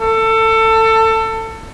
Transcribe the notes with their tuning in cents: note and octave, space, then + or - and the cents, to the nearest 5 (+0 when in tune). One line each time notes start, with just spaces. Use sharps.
A4 +25